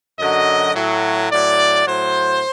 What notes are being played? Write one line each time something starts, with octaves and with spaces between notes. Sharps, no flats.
F#2 D3 F#3 D#5
A2 F#3
A2 F#3 D5
A2 F#3 C5